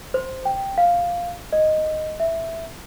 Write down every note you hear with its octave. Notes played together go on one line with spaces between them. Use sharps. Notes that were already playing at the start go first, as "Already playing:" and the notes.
C5
G5
F5
D#5
E5